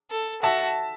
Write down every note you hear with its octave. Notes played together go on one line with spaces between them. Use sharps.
A4
F#4 E5 A5